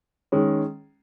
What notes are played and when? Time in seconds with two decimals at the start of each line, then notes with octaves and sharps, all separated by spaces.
0.32 D#3 G#3 C#4